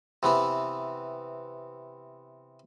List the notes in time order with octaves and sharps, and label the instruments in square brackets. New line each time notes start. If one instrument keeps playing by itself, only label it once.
[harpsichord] C3 E3 B3